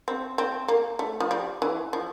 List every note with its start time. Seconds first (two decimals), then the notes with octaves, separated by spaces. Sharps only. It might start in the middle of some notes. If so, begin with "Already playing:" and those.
0.08 C4
0.38 C4
0.68 A#3
0.99 A3
1.20 F3
1.31 G3
1.62 E3
1.93 F3